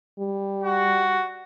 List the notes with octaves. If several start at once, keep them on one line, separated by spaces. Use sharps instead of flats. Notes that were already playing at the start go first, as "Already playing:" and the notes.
G3
F#4